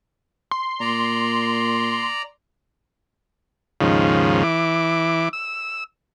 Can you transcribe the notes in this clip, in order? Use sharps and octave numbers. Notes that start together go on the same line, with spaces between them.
C6
A#2 D5 A#5
D#2 G#2 C#3 F3
E3 D6
E6